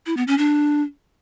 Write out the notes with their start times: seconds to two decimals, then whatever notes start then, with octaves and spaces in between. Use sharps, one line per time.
0.06 E4
0.17 B3
0.27 C#4
0.38 D4